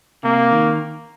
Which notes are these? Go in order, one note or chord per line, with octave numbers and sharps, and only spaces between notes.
C3 A#3
D#3